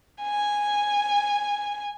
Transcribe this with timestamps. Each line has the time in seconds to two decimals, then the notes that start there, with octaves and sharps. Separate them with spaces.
0.22 G#5